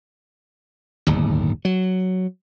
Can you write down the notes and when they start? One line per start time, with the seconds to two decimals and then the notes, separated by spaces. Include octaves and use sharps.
1.07 D1 G1 D#2
1.65 F#3